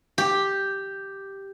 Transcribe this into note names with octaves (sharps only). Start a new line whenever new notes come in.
G4